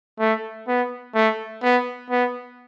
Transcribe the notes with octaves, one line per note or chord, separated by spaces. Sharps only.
A3
B3
A3
B3
B3